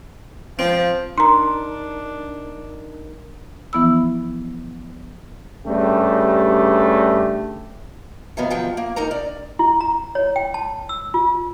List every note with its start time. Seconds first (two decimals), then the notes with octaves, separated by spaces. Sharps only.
0.59 F3 C4
1.18 D4 D#4 A#4 A#5 C6
3.73 E3 F3 B3 E4 B5 E6
5.66 G2 C#3 A3 G4
8.37 C3 D#3 F#3 B3 F4
8.50 D2 F3 F#3 G5
8.77 A#3
8.96 D#3 D#4 A#4 A#5
9.11 D5
9.59 E4
9.80 A#5
10.15 C#5
10.36 G5
10.54 A5
10.89 E6
11.14 F4